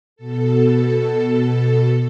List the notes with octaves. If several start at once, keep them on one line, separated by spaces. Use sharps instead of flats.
B2 A4